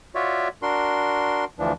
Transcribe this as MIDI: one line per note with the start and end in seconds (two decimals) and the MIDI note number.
0.15 0.48 65
0.15 0.48 66
0.15 0.48 73
0.15 0.48 74
0.15 0.48 76
0.62 1.45 62
0.62 1.45 66
0.62 1.45 70
0.62 1.45 84
1.59 1.73 38
1.59 1.73 52
1.59 1.73 53
1.59 1.73 62